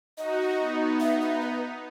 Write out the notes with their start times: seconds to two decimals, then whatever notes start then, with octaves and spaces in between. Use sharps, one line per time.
0.17 D#4 F#4 D#5
0.58 B3 D#4
1.00 E5
1.22 E5
1.42 B4